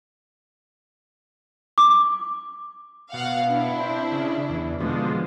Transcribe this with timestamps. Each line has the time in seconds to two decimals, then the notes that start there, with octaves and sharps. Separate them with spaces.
1.78 D6
3.13 B2 F5 F#5
3.47 D4 E4
3.80 C4
4.12 C#3
4.50 E2
4.80 B2 D3 F3 G#3